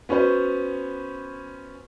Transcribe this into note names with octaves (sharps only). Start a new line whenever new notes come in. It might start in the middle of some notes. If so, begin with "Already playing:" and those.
B3 C#4 F#4 B4 C5